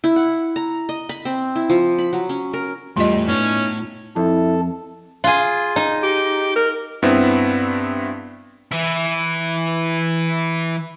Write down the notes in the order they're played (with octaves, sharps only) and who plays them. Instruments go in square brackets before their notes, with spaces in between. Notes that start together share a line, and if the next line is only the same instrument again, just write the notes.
[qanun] E4
F#5
A#5
D#5
B5
C4
E4
F3
B5
F#3
C#4
A#4
[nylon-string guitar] E2 G3 E4 [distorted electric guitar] A2 [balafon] F4 D#5
[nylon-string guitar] B3 D#4 [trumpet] C#4
[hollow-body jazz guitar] F2 [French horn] E4 [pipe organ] A4
[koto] F4 G#4
D#4
[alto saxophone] G4
A#4
[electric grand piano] G2 B3 C4 E4
[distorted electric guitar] E3 E4